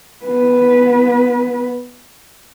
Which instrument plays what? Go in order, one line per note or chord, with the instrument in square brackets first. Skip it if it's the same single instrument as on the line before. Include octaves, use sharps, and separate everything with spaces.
[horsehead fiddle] B3 B4